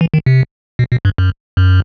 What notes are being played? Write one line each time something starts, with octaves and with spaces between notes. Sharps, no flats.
E3
D#3
C3
B2
B2
G2
F#2
F#2